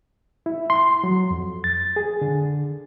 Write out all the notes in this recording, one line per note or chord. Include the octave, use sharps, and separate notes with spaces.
E4
C6
F#3
F2
A6
G#4
D3